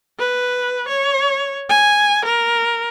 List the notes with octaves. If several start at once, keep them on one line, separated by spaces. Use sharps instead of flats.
B4
C#5
G#5
A#4